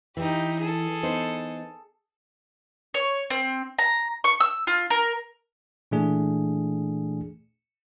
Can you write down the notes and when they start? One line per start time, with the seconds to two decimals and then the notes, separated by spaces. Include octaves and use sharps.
0.17 E3 D#4 G4
0.61 G#4 A4
1.03 B3 D#4 C5
2.94 C#5
3.30 C4
3.79 A#5
4.24 C#6
4.40 E6
4.67 F4
4.90 A#4
5.91 A#2 E3 A3 D4 G#4